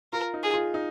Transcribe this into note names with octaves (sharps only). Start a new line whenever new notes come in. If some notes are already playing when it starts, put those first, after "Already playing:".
F4 A#4
D#4
G#4
F4
D#4